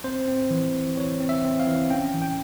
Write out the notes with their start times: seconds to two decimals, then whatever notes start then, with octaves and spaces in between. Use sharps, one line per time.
0.04 C4 C5
0.28 C4
0.51 E3
0.75 E3
0.97 E3 C#5
1.20 C4
1.29 E5
1.45 C4
1.60 F5
1.67 E3
1.91 C#4 G5
2.14 E3
2.22 G5